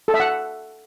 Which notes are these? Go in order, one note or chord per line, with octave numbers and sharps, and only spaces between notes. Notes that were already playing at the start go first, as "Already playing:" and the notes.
A4
E5
F#5